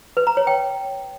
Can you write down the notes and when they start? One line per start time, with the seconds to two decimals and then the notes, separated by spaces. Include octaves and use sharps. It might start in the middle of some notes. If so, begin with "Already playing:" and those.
0.17 B4
0.27 A#5
0.37 C#5
0.47 G5